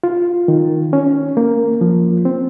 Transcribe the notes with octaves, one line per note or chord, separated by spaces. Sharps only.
F4
D#3
C#4
A#3
F3
C4